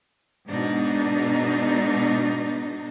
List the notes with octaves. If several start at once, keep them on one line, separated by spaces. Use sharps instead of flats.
G#2 B2 D4 D#4